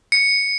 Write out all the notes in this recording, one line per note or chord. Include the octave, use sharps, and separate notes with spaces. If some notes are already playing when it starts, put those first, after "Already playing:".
C#7